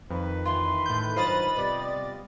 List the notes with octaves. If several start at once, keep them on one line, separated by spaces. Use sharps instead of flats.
F2 D#3 B4
E3 F4 C6
A2 G6
G2 F#3 F4 C5 D#5 B5 A6
C3 G3 B3 D5